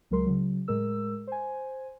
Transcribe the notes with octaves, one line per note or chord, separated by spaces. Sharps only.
C#2 F#3 G#3 A#4 C6
C#3 F#3
A2 G#3 A#4 E6
C5 G#5